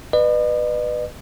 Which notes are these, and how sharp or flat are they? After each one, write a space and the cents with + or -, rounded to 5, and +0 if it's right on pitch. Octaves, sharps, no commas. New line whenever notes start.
B4 +0 D#5 -45